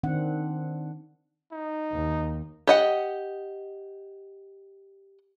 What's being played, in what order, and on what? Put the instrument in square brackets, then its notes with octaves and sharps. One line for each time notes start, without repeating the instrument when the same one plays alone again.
[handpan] D#3 C4 D4 F#5
[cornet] D#4
[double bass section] D#2
[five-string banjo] G4 D#5 F#5